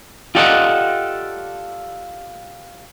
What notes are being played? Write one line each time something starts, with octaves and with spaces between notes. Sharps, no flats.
F4 G4 A4 D5 D#5 F#5